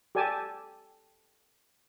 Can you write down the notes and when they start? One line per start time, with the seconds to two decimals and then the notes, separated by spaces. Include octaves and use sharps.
0.15 G4 A4 D5 G#5 A5